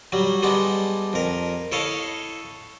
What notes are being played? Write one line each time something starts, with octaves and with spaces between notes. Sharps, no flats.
F#3 G3
G3 G#3 B3 D4
F2 A#4
E4 A4 C#5 D#5 F5